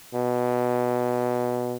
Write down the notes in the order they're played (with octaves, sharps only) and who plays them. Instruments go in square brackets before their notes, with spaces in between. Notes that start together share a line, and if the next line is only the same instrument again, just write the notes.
[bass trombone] B2